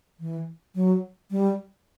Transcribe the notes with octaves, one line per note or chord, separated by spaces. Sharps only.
E3
F#3
G3